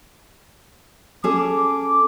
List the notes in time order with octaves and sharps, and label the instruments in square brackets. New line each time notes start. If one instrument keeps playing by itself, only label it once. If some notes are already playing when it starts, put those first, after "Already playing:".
[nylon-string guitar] C#4 G#4 A4 [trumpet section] D6